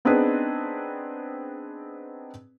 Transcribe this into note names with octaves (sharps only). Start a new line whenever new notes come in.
B3 C4 D4 D#4 G#4 B4